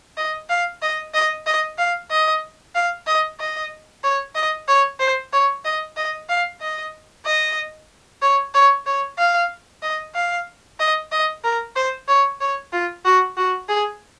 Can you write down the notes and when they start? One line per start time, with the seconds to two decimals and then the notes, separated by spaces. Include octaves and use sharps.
0.17 D#5
0.50 F5
0.82 D#5
1.14 D#5
1.46 D#5
1.78 F5
2.11 D#5
2.75 F5
3.07 D#5
3.40 D#5
4.04 C#5
4.36 D#5
4.68 C#5
5.00 C5
5.33 C#5
5.65 D#5
5.97 D#5
6.29 F5
6.61 D#5
7.26 D#5
8.22 C#5
8.54 C#5
8.86 C#5
9.18 F5
9.83 D#5
10.15 F5
10.80 D#5
11.12 D#5
11.44 A#4
11.76 C5
12.08 C#5
12.41 C#5
12.73 F4
13.05 F#4
13.37 F#4
13.69 G#4